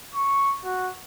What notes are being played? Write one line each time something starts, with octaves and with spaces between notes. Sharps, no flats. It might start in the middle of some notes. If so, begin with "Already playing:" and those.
C#6
F#4